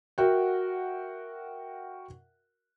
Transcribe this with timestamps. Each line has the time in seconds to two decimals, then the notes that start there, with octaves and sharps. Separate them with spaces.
0.18 F#4 A#4 E5 F#5 G5